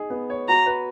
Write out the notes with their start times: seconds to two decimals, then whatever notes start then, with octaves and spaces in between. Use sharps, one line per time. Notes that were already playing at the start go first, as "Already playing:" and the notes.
Already playing: D#4 G#4
0.10 B3
0.30 C#5
0.48 F#4 A#5
0.66 B4